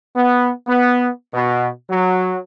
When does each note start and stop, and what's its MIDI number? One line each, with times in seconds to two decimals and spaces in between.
0.16 0.51 59
0.67 1.08 59
1.33 1.68 47
1.90 2.38 54